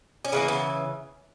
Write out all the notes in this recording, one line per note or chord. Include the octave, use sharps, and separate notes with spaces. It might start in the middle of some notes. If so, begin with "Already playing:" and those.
C#4
C#3 E3 A#3 B3
B3